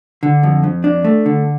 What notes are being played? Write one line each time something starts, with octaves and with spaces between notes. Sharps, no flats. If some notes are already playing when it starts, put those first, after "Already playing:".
D3
F2
F2
D4
A3
D3